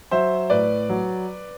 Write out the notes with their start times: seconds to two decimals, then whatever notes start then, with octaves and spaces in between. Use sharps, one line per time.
0.11 F#3 C5 E5
0.50 A2 B4 D5
0.89 F#3